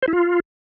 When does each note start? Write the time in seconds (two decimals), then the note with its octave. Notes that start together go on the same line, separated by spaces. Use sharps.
0.02 C5
0.08 E4
0.13 F4